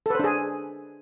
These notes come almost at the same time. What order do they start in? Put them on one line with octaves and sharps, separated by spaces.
A4 B4 C5 D4 G#4